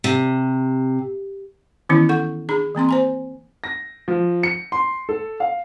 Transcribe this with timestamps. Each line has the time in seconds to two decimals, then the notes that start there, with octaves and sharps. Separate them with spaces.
0.04 C3
1.89 D#3 E3 B3 C#4 E4
2.09 A4 F#5 C#6
2.49 D4 G#4 A#5
2.75 E3 A#3 C4 C6
2.89 C5 G#5 A#5
3.64 A#6
4.08 F3
4.43 C#7
4.72 C6
5.09 A4
5.40 F5